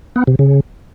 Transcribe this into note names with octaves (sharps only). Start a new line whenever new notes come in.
B3
C3
C#3